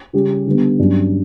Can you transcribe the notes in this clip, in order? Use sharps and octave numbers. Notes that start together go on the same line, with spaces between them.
C#3 G3 C#4 G4
D3 G3 B3
G2 F#3 C#4